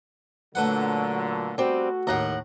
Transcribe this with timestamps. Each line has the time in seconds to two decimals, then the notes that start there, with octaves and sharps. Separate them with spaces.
0.55 A#2 D3 F#3 A3 B4 F#5
1.58 G3 C4 F#4
2.07 D#2 A2 F#5 A#5